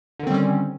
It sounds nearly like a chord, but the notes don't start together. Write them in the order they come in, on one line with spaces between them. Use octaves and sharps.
D3 D#3 C4 G3 C#4